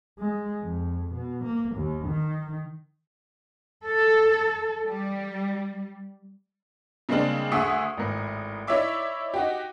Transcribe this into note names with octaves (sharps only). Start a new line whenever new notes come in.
G#3
F2
B2
A#3
D#2
D#3
A4
G3
C#3 G3 G#3 A#3 C4 D4
D2 G#4 E5 F#5 C#6 D#6
G#1 A2 A#4
D#4 E4 C#5 D5 E5 D6
D#4 F#4 G4